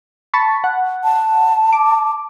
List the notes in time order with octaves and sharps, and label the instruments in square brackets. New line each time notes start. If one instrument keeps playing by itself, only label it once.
[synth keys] A5 B5 C#6
F#5
[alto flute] A5
[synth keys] D6